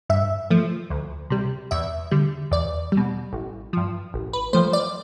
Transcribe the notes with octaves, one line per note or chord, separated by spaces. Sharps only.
G2 E5
F3 A3
D2
C3 G3
E2 E5
D3 G3
E2 D5
G3
B2
A1
G2 F3
A1
B4
G2 F3 A3 C5
D5